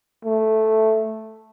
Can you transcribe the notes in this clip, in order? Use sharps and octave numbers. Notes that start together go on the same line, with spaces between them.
A3